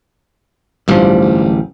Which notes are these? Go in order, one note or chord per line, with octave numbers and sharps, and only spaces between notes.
D1 A1 G2 F3 G3